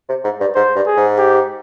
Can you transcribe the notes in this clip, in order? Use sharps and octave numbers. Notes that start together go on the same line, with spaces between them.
C3
G#2
G2
G#2 C5
G2
G#4
G#2
G4